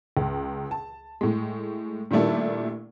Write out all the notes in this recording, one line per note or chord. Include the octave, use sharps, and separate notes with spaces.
C#2
A5
A2 G#3
A#2 D#3 G3 A3 D4 E4